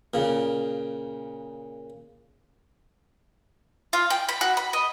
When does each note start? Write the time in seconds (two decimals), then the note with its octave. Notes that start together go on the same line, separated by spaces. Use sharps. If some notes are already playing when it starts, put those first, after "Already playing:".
0.14 A#2 C#3
3.93 F4
4.10 G5
4.29 B5
4.41 F#4
4.57 B5
4.73 D#5